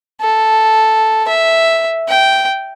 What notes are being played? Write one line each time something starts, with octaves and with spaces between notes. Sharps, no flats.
A4
E5
G5